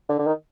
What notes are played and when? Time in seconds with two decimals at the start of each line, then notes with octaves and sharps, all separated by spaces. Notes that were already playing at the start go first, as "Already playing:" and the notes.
0.09 D3
0.19 D3
0.27 D#3